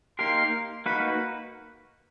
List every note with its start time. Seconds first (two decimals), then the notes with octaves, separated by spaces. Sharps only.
0.19 A#3 D#4 G4 A#4 C6
0.86 A#3 D#4 F#4 B4 B5